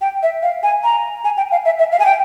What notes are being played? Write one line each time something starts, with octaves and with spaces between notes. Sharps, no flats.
G5
E5
F5
G#5
A#5
G#5
G5
F5
E5
E5
F5
G#5
G5